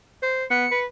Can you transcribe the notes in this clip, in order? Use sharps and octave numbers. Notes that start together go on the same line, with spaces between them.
C5
B3 C#7
B4